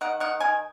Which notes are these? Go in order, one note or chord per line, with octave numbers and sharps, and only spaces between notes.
D#3 F#5
D#3 F#5
D#3 G#5